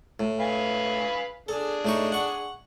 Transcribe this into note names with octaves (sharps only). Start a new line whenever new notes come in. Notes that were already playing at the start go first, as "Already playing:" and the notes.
A2
B4 F5 G#5
D4 G#4 A4
A2 D#4 C#6
F#5 C#6